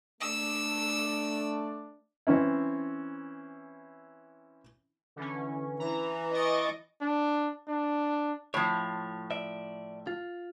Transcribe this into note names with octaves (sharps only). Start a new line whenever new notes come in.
A3 D4 D5 E6
E3 C4 C#4 E4
D3 E3 C#4
E3 A#5
D#5 C#6 A6 D7
D4
D4
A2 F3 C#5
D5 E5
F4